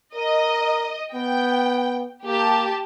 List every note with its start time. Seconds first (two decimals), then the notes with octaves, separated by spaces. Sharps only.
0.15 A#4 D#5
1.14 B3 G5
2.26 A#3 G4 A5